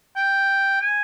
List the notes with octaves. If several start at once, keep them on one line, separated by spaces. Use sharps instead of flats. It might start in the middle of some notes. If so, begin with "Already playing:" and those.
G5
G#5